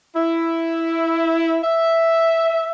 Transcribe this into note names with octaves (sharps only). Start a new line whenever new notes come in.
E4
E5